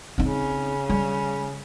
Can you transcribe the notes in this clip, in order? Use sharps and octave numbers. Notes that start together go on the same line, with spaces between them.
C#3 C4 D#4
G3